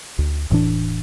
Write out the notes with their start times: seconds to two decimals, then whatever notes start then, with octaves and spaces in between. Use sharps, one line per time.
0.19 D2
0.50 E1 A2 E3 D4